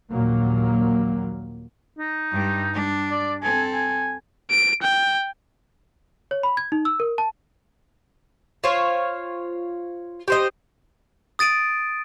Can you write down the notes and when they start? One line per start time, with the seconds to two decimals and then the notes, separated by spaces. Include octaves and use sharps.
0.10 A#1 D#2 A#2 F#3 A#3
1.99 D#4
2.32 G2 G3
2.74 G3 D4
3.11 D5
3.43 C4 A4 G#5
3.74 G#5
4.50 D7
4.82 G5
6.31 C#5
6.43 B5
6.57 G#6
6.72 D#4
6.85 E6
7.00 A#4
7.18 A5
8.64 F4 C5 C#5 F5
10.28 G4 C5 D#5
11.39 D#6 A6 D7 D#7